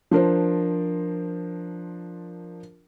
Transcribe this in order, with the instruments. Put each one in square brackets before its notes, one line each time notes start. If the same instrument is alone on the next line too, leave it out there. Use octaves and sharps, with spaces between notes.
[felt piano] F3 D4 A#4 C5